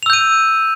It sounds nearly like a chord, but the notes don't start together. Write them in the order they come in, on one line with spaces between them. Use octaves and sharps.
F7 E6 G6 D#7